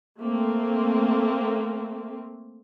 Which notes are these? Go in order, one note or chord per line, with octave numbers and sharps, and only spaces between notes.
A3 A#3 C4